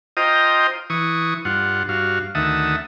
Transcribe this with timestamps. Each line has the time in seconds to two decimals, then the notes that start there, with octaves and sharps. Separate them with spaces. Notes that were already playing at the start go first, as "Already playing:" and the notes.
0.17 F4 C5 D#5 G5 A#5 D#6
0.90 E3 C#6 D#6
1.45 G2 F4 F#5
1.89 G2 F#4 F5
2.35 D2 D#3 E5 F#5 A5 D#6